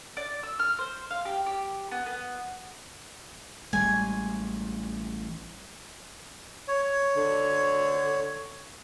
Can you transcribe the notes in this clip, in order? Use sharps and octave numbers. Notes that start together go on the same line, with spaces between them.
D5
E6
F6
C5
F5
G4
G4
B3
B3
A1 G3 G#3 G#5
C#5
D3